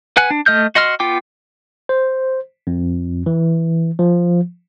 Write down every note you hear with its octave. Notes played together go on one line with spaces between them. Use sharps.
B4 F#5 G#5 F#6
D4
A3 D#5 F6 G6
F#4 D#5 C6 F6
B3 F4 G5 D6
C5
F2
E3
F3